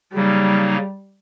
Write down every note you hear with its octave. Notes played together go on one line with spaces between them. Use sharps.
C#3 F#3 G3 A#3 D#4